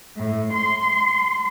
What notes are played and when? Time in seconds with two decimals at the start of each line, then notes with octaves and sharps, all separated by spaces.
0.16 A2
0.53 C6